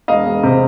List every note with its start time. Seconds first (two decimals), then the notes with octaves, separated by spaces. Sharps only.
0.08 E1 D#5 F5
0.26 E1
0.43 C3